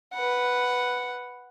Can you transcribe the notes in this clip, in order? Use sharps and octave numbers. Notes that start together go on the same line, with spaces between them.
B4 F#5